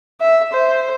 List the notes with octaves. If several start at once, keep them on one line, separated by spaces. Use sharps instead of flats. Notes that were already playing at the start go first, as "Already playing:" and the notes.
E5
C5